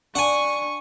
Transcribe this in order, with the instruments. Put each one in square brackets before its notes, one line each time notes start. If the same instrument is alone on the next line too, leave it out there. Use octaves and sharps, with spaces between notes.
[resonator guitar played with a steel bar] D4 [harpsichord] F#5 G#5 [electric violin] C#6